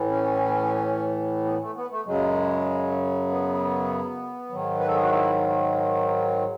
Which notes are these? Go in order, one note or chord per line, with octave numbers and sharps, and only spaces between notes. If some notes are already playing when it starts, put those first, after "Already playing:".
Already playing: A2 E3
C#4
B3
A3
B3
A3
F#2 C#3 F#3 G#3
B3
G#2 D#3 F#3
B4
A4
G#4
F#4
E4